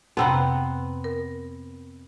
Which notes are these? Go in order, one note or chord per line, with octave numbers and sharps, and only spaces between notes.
F2 C3 B3 C4 F#5 A#5
A#4